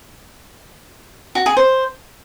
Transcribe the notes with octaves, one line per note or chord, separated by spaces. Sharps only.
F#4
G#4
C5